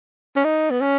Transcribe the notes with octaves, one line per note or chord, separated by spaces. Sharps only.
C#4
D#4
B3
C#4